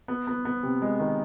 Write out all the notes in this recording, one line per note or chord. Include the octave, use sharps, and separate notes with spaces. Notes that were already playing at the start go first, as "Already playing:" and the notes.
B3
B3
B3
C3
G#3
D#3